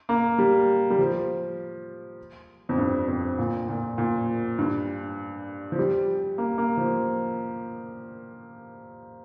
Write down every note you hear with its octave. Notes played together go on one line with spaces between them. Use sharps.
A#3
G3
G3
F3
F2
G2
F2
A#2
A#2
A#2
G2
F3
G3
A#3
A#3
F3